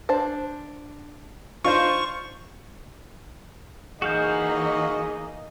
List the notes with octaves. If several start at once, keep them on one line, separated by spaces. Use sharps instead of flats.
D4 C5 A5
D4 D#4 F4 C5 C#6
E3 A#3 D#4 F#4 G#4 D#5 F5 G6